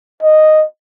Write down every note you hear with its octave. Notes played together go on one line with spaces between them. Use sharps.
D#5